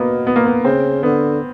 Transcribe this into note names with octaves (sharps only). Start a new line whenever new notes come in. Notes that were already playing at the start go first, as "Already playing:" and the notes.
Already playing: B2 A#3 B3
B3
A#3
B3
C#3 C4
D3 B3